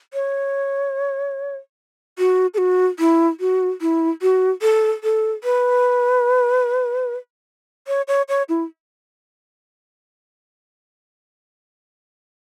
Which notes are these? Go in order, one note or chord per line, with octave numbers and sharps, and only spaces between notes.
C#5
F#4
A4
F#4
E4
F#4
E4
F#4
A4
A4
B4
C#5
C#5
C#5
E4